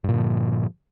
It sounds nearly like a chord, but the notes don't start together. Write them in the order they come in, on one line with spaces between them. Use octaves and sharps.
G2 A#2 D3 F3